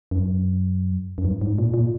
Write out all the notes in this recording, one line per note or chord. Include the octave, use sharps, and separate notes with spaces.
F#2
F#2
G2
G#2
A#2
A#2